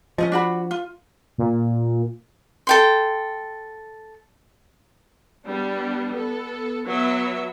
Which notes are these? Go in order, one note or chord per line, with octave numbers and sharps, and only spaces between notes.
F3 C#4 D#4 D#5
D4 F#4 B5
F4
A#2
A4 G5 C6
G3 B3 D4
B3 A4
F#3 B3 E5